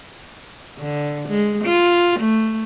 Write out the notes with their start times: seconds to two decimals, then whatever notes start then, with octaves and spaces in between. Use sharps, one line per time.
0.79 D3
1.29 G#3
1.64 F4
2.20 A3